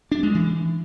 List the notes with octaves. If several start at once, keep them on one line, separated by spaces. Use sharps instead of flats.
D4
G#3
E3